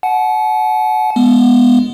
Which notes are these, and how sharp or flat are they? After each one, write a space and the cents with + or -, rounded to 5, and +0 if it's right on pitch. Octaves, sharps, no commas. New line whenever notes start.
F#5 +0 A5 -40
G#3 +0 B3 +0